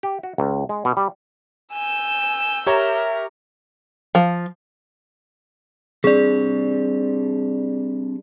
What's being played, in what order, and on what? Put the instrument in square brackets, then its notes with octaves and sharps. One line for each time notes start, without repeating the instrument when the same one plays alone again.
[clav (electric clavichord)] G4
F#4
C#2
G#3
B2
G3
[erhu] G#5 [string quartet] E6 G6
[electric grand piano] G4 C#5 A#5 [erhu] A#4 [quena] E5
[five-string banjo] F3
[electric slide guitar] G3 C4 D4 [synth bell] G#4 D5